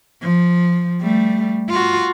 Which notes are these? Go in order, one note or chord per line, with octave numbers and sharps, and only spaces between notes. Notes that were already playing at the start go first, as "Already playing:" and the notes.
F3
G3 A3
F4 F#4